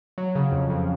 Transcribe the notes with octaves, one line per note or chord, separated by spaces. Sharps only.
F#3
C#3
F2
F2